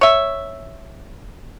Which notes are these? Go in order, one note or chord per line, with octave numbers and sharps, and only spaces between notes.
C#5 E5